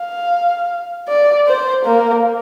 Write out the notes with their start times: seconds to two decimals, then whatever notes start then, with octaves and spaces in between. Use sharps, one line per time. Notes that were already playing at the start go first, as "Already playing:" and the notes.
Already playing: F5
1.08 D5
1.48 C5
1.85 A#3